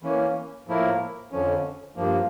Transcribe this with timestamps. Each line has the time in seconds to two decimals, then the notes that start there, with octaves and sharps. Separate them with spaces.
0.02 E3 A#3 C#4
0.67 A2 F3 A#3 E4 A#4
1.31 F2 D3 F3 C#4
1.96 G2 F3 A#3